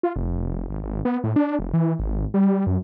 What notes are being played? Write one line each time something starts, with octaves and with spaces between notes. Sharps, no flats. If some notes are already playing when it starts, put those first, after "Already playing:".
F4
F1
G#1
G#1
B3
A2
D4
F1
E3
G#1
G3
F#2